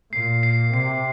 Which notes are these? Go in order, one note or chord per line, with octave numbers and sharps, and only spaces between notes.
A#2 C7
C7
C3 C7